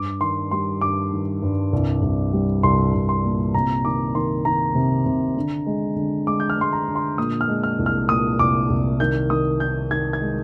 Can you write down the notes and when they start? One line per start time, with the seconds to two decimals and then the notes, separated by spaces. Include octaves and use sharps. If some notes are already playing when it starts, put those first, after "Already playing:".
Already playing: G2 D6
0.21 D#3 C6
0.51 G3 C6
0.81 G2 D6
1.12 D#3
1.42 G2
1.73 C2
2.02 C2
2.33 G3
2.63 C2 C6
2.94 C2
3.09 C6
3.24 A#2
3.54 C3 A#5
3.85 D#3 D6
4.15 D#3 C6
4.45 D#3 A#5
4.75 C3
5.06 C3
5.36 D3
5.66 G#3
5.96 D3
6.27 G#3 D6
6.40 G6
6.50 F6
6.57 G#3 C6
6.73 A#5
6.88 D3
6.95 C6
7.18 A#2 D#6
7.41 F6
7.48 G#3
7.63 F6
7.79 C2
7.86 F6
8.09 A#2 D#6
8.39 C2 D6
8.70 C2
9.00 D#3 G6
9.30 D#3 D#6
9.60 D#3 G6
9.91 D#3 G#6
10.13 G#6
10.21 G#3